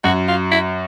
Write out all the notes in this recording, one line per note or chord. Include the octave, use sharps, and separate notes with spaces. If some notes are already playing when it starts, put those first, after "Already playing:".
F#2 F#4
F4
E4